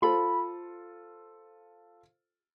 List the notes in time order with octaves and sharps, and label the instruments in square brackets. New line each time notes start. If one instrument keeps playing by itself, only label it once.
[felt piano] F4 A4 C5 [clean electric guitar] B5